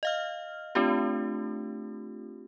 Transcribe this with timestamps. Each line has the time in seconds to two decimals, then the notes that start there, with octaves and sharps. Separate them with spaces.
0.03 D#5 F5 F6
0.75 A3 C4 D4 F4 G4